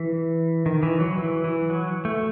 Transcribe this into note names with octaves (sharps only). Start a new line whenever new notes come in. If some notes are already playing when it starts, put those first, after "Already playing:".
Already playing: E3
D#3
E3
F#3
E3
E3
F#3
A3